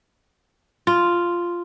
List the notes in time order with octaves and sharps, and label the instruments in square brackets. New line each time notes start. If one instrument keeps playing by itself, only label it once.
[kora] F4